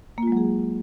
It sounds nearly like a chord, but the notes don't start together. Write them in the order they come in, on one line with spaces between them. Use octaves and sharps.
A#3 F4 G#3 F#3 G#4